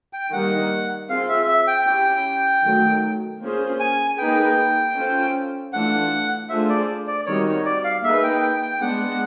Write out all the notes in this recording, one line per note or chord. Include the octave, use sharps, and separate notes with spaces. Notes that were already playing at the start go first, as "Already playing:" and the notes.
G5
D#3 G3 A#3 F#5
C4 F4 G#4 F5
E5
E5
G5
C#4 E4 G4 G5
D#3 F#3 A3
A#3 C#4 F4 G#4 C5
G#5
A#3 D#4 G#4 B4 G5
C#4 F4 A4 C5
E3 A3 D4 F4 F#5
A3 D4 F4 G#4 C5 E5
D5
D5
D#3 G3 C4 D#4 F#4 C#5
C#5
D5
F5
A#3 D#4 G#4 B4 E5
G5
G5
G5
G#3 B3 D4 F#5